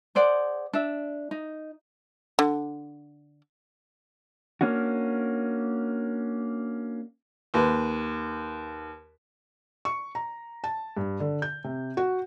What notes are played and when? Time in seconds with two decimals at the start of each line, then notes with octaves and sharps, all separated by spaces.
0.15 G#4 C5 D5 F#5
0.73 D4 E5
1.31 D#4
2.39 D3
4.61 A#3 C#4 D4 F#4
7.54 D#2 B4
9.85 C#6
10.15 A#5
10.64 A5
10.97 G2
11.20 D3
11.42 G6
11.64 C3
11.97 F#4